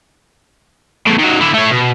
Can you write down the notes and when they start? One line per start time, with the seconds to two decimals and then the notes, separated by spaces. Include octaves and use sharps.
1.07 E2 A2
1.19 D#3 F#3
1.41 D3 E4
1.54 A3 C#5
1.71 B2